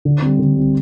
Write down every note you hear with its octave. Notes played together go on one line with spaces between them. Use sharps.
D3
G3 C4
D3
G3 C4